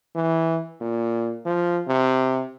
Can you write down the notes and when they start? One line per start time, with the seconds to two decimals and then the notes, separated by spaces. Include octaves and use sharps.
0.15 E3
0.81 A#2
1.46 F3
1.87 C3